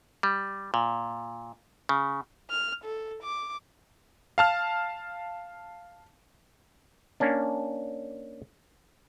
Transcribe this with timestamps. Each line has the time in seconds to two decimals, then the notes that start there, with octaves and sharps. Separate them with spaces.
0.23 G3
0.74 A#2
1.89 C#3
2.50 F6
2.85 A4
3.23 D6
4.38 F5 A5 F6
7.20 A#3 C#4 D4